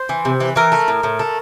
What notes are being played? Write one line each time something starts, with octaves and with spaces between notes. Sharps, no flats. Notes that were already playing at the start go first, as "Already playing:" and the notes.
Already playing: C5
E3
C3
E3
E3 A#4
A3
A2
A2
A3